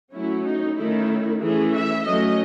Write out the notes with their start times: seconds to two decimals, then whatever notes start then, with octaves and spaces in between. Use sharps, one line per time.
0.14 F#3 A3 C#4 E4
0.46 D#4
0.78 D#3 A3 C#4 E4
1.42 E3 A3 C#4 G#4
1.73 E5
2.05 F#3 A3 C#4 D#5